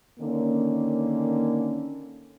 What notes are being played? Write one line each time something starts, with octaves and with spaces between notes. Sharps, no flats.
D3 D#3 A#3 C#4